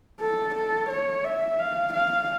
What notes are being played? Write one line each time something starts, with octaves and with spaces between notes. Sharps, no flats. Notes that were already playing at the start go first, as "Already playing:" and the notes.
A4
A4
C#5
E5
F5
F5